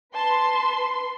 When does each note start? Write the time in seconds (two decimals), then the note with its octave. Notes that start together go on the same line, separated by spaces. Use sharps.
0.14 B4 A5 C6